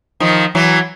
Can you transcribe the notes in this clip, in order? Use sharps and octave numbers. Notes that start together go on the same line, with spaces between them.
D#3 F3
E3 F#3